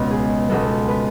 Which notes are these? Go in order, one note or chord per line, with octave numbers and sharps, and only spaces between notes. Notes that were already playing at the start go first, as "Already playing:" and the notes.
Already playing: C#2 B2 G#3 B3 C#5 D#5
G#4
C#2 B2 G#3 B3 A4
B4